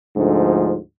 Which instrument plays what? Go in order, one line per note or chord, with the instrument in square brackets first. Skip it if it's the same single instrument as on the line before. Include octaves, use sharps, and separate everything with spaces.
[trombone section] D2 G#2 D3 F3